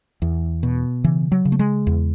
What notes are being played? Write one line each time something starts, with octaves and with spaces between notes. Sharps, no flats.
E2
B2
C#3 E3
F#3
C#3
A3
G#3
E2